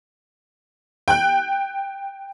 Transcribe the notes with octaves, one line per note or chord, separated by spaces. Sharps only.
G5 F#6